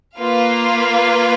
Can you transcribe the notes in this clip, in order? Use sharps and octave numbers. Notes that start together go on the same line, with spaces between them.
A#3 F4 B4 F5